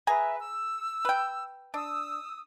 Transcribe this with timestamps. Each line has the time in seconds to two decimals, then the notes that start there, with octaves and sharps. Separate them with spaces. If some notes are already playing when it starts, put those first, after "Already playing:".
0.07 G#4 B4 E5 G#5 A#5
0.39 E6
1.05 B4 G5
1.74 D4 D#6 E6